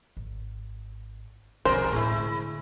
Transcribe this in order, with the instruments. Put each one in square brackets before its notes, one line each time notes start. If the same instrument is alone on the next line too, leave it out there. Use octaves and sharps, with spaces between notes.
[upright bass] G#1
[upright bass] B1 F2 [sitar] G#2 B2 A#4 [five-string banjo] C5
[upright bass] A2 D3 [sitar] G#3 E4